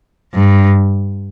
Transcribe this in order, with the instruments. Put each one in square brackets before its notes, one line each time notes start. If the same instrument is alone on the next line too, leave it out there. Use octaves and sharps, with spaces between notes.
[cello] G2